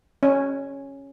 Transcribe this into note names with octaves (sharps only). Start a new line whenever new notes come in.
C#4